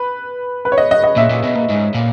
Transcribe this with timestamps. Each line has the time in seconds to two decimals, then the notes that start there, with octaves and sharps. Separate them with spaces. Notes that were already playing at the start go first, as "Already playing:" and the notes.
Already playing: B4
0.65 B4
0.72 C#5
0.78 D#5
0.91 D#5
1.04 D#5
1.16 A#2 E5
1.30 A#2
1.43 B2
1.55 A#2
1.69 G#2
1.95 A#2